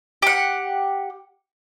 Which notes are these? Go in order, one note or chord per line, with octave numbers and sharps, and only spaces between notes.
G4 F#5